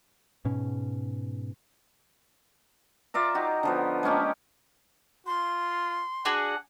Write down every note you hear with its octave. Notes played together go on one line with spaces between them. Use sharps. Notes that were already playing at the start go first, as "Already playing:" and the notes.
G#2 B2 C#4
F4 D5 E5 A#5
D#4 F#4 G4
D3 F3 B3
G#3 A#3 C#4 G4
F4 C6
D4 F#4 G#4 F#5